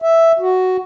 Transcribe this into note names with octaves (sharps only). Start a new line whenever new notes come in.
E5
F#4